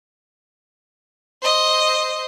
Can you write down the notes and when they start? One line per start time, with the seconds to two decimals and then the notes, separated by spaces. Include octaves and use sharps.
1.42 C5 D#5